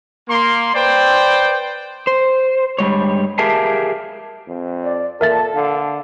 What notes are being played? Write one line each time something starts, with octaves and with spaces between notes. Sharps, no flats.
A#3 C6
B4 C5 D5 G5
C5
G2 G3 G#3 C#5
G4 G#4 A#4 E5 F5 A5
F2
D5
A#2 A4 A#4 E5 A5 A6
D3 F5